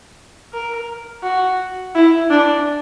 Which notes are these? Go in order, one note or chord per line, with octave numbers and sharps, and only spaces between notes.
A#4
F#4
E4
D4